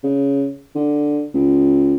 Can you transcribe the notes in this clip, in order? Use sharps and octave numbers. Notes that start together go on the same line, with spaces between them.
C#3
D3
C#2